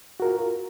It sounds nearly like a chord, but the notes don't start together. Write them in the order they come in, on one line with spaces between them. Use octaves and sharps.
F#4 A#4 F4